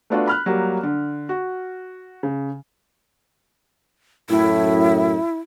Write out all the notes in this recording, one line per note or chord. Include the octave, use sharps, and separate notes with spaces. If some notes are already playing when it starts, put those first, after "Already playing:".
A3 B3 D4 F4 F#4 A5
B5 F6 F#6
F#3 G3 A#3
D3
F#4
C#3
F#2 A2 E4